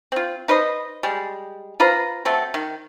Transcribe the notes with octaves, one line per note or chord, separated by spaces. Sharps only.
C4 F4
D#4 B4 C5 D#5
G3 G#3
F4 B4 C5 A#5
F#3 A3 C4 A4
D#3